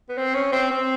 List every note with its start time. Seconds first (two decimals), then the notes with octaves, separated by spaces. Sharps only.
0.09 B3
0.17 C4
0.34 C#4
0.52 C4
0.71 C4